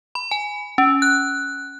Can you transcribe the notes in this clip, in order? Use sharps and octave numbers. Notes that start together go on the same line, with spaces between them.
B5
G#5
C#4
F#6